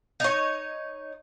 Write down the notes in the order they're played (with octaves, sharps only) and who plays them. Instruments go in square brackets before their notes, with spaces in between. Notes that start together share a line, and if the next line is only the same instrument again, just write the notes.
[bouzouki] D#4 C#5